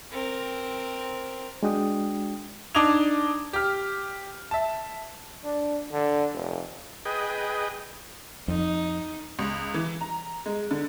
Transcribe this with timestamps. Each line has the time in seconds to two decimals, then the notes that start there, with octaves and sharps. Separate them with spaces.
0.11 C4 A#4
1.63 G#3 D4 F#4 G5 D#6
2.75 D4 D#4 D6 D#6 G#6 F7
3.53 G4 F6
4.51 E5 A5
5.44 D4
5.92 D3
6.33 F1
7.05 G#4 B4 D#5 G5
8.48 F2 D#4
9.39 C#2
9.74 E3
10.01 A#5
10.46 G#3
10.71 D3